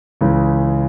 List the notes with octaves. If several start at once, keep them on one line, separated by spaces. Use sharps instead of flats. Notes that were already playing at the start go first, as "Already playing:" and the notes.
C#2 C#3 E3